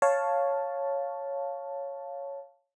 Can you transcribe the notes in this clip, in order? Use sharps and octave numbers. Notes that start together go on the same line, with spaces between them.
C#5 F5 A5